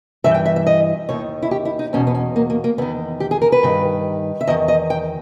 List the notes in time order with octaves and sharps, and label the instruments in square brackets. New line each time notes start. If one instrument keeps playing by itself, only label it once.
[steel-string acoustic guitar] G2 E3 E5
G5
E5
E5
D#5
D#2 D#3 C#5
E4
G4
E4
D#4
E2 B2 C#4
B3
C#4
A#3
A#3
A#3
E2 D#3 B3
G4
G#4
A#4
B4
G2 D#3
E5
E2 D#3 D#5
D#5
G5